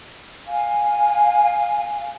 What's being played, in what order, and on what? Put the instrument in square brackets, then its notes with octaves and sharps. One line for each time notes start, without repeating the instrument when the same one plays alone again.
[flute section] F5 G#5